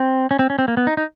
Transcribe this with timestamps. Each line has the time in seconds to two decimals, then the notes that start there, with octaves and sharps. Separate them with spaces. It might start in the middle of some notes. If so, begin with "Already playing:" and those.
Already playing: C4
0.31 C#4
0.39 C4
0.50 C#4
0.59 C4
0.68 A#3
0.77 B3
0.87 D#4
0.97 D#4